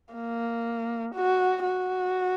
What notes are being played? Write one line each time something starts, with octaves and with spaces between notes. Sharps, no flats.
A#3
F#4
F#4